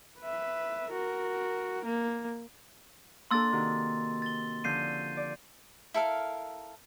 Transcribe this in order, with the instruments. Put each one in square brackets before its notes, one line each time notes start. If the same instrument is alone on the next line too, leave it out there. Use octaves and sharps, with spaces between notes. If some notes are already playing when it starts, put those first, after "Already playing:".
[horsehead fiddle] B4 E5
F#4 A#4
A#3
[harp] A#3 D4 A4 [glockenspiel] C6 E6 A6
[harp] C3 D#3 F#4
[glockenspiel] A6 G7
[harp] D3 F3 C#4 [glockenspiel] G6 C7 D#7
[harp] D5
[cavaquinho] E4 A4 A#4 F5